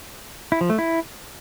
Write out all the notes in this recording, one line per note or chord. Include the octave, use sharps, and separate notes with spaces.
E4
F3
A3
E4